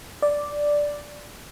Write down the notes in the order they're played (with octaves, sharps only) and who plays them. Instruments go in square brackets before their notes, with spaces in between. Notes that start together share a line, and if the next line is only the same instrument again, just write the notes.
[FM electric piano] D5